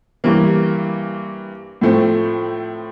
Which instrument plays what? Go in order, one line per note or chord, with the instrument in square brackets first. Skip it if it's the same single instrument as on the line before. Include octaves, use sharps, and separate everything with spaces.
[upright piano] G2 E3 A#3
A2 F3 A3 C4